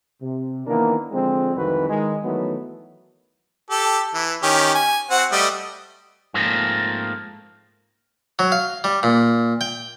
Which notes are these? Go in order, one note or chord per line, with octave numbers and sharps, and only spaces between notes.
C3
D#3 E3 A#3 B3 D4 A#4
D3 F3 G#3 C4
C2 F2 D#3 E3 F#4 B4
D#3 G#3
D#3 E3 F#3 A3 B3
G4 A4
E3
D#3 C#4 G4
G#5
C4 F#4 F#5
G3 A3 D#5
G#2 F3 A3 A#3 C4
F#3
F5
G3
A#2
G5